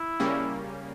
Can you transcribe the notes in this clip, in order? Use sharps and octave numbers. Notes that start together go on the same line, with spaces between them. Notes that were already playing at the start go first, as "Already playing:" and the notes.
Already playing: E4
C#3 G3 A#3 C#4